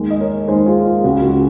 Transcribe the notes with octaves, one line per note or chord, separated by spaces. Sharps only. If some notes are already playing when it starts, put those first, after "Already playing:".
Already playing: D#2 D#3 G#3
D#5
A#4 C#5
D#2 D#3 G#3 G#4 C5
F4 G#4
F4
C#2 C#3 G#3 F#4
G#4
F#4